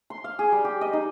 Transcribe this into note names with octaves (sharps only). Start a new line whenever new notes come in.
C6
F5
G#4
G3
G4
D#5
D#4